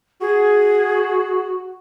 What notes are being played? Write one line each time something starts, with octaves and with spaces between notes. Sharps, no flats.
F#4 G#4